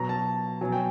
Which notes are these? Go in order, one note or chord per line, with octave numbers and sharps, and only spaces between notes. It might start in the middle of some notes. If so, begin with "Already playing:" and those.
Already playing: B2 F#3 A#5
A5
B2 F#3 G#5
G5